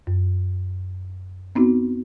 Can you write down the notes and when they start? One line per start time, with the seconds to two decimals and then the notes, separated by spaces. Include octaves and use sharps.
0.07 F#2
1.55 B3 C4 D#4 F#4